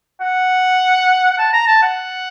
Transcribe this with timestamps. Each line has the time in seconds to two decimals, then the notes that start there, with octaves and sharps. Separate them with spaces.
0.20 F#5
1.31 F#5
1.38 A5
1.53 A#5
1.67 A5
1.82 F#5